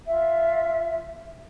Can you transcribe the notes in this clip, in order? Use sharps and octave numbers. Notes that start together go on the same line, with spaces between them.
F4 E5